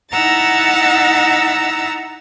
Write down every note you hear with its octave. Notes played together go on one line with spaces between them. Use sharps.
D#4 E4 F#5 A#5 E6 A6